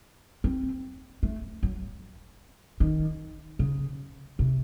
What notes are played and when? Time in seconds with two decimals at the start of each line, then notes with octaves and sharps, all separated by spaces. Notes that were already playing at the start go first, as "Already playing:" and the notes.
0.44 C4
1.23 A3
1.63 F#3
2.80 D#3
3.59 C#3
4.39 C3